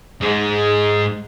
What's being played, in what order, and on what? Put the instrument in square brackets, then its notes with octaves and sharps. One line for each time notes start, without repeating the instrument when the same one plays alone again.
[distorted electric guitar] G#2 G#3